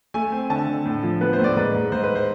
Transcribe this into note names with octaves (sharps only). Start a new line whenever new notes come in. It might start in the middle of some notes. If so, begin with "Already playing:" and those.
A3 G#5
C4
D3 A5
D3
A2
F3
B3 B4
C5
A2
D5
G#2 B4
G#2
G#2 C5
B4
C5